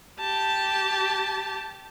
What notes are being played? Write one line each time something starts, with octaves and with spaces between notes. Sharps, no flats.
G4 A5